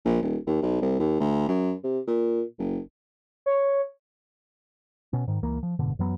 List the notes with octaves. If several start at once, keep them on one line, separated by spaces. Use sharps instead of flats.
A#1
D#1
D#2
B1
C2
D#2
D2
F#2
C3
A#2
F#1
C#5
B2 C#4
G#2 D#3
C#2 E3 A#3
F3
F#1 G#2 B2 D3
F#2 E3 F#3 B3